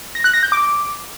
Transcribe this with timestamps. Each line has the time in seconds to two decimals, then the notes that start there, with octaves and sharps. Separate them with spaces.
0.15 A#6
0.24 F#6
0.34 A#6
0.43 G6
0.52 D6